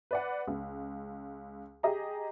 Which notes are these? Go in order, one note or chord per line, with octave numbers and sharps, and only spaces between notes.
B4 D5 F#5
C#2
G4 G#4 D#5 A#5